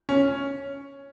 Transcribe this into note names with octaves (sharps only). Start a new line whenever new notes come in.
C#4